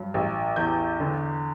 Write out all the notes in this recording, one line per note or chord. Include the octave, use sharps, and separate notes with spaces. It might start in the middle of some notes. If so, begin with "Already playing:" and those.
Already playing: G2 F#3
A1
E2 G6
D3